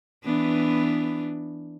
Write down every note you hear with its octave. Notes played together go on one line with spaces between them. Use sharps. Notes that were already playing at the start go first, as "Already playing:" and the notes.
E3 B3 D4